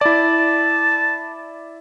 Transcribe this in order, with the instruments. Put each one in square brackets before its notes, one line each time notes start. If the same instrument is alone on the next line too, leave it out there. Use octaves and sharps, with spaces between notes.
[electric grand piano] E4 D5 [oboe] A5